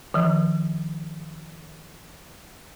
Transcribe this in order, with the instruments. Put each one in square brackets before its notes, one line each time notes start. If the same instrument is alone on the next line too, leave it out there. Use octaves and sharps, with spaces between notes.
[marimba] D#3 F3